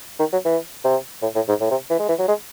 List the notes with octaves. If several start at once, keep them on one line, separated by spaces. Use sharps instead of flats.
D#3
F#3
E3
C3
A2
A2
G#2
A2
C3
E3
G#3
E3
F#3
G#3